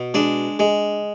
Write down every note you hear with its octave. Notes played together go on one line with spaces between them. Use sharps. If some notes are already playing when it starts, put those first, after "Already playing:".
Already playing: B2
G#3 D4
G#3